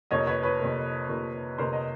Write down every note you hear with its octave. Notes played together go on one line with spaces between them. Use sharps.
F2 C3 F3 A#3 C#5 D#5
B4 C#5
B4 C#5
F2 C3 F3 A#3
F2 C3 F3 A#3
F2 C3 F3 A#3 A#4 C5
D#5